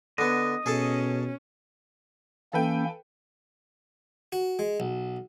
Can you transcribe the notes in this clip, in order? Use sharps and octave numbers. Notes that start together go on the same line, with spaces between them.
D3 B3 D#5
B2 C#4 G#4 A4 A5
E3 A#3 C#4 A4 B4 G5
F#4
G#3
B1